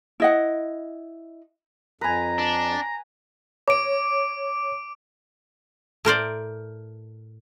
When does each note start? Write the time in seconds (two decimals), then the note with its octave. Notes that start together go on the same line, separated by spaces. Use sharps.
0.20 E4 D#5 F#5
2.01 F2 B4 G#5 A#5
2.38 D4
3.68 C#5 D6 D7
6.05 A2 A#4 C5 D5